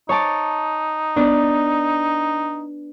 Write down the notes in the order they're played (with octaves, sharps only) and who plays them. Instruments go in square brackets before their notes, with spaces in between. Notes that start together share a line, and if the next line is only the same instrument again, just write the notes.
[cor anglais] D#4 [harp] C#5 A5 D6
[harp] B3 D4